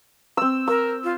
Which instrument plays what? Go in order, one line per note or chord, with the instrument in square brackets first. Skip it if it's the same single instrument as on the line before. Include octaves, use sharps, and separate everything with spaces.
[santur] C4 E6
[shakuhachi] A#4 [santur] E6
[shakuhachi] F4